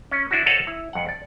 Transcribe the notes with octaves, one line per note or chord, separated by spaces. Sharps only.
C#4
D4 E4 F#4
A4 C5 C#5 D#5 F5 F#5
E4
F2 F#5
D5